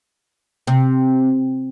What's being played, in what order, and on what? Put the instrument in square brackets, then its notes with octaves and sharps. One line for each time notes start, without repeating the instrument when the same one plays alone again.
[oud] C3